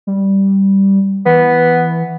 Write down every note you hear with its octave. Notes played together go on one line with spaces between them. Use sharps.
G3
E3 B3